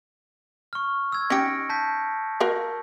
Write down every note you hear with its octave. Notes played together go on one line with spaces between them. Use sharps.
C#6 F6
E6 G#6
C#4 D#4 G4 A#6 C#7 D7
A5 G6 B6
F#4 A#4 F5